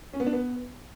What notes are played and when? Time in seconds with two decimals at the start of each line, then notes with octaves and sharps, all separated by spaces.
0.13 C#4
0.20 B3
0.26 D4
0.33 B3